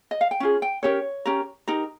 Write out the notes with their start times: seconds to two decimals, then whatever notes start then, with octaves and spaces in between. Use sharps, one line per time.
0.11 D#5
0.21 F5
0.31 G5
0.40 C#4 F4 G#4
0.62 G5
0.83 C#4 G4 A#4 C#5
1.26 C#4 G4 A#4
1.68 D#4 G4 A#4